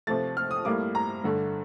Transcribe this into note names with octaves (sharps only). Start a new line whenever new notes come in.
C3 F3 A3 A6
F6
D#6
A2 G3 A#3 D6
A#5
G2 D3 A3